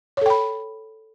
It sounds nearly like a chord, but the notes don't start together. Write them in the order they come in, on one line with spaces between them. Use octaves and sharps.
C#5 A4 G5 B5